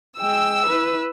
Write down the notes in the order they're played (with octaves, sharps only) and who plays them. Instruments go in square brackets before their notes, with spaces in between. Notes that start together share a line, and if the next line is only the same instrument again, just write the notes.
[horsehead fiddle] G#3 G5 [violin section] E6
[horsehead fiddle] E4 B4